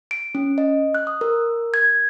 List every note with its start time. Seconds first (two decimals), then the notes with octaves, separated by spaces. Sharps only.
0.11 D7
0.35 C#4
0.58 D#5
0.95 F#6
1.07 D#6
1.21 A#4
1.74 G#6